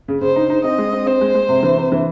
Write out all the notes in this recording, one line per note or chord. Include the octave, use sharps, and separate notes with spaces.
C#3
C#3 C5
D#4
D#4
C4 D#5
G#3
C4
C4 C5
G#3
G#3
C3
E3
C3
E3